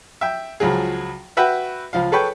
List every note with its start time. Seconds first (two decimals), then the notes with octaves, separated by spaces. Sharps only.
0.21 E5 G5
0.60 C#2 F3 F#3 G#4
1.37 F#4 B4 E5 F#5 G5
1.93 C#2 F3 F5
2.12 G#4 A4 B4 C#5 G5